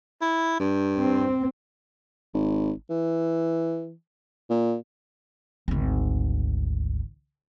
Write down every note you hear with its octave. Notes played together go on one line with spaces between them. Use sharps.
E4
G2
C4
G#1
E3
A#2
G#1 D2